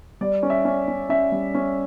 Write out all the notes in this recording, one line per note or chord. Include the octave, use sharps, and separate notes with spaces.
G3 D5
C#4
E5
C#4
C#4
C#4 E5
G3
C#4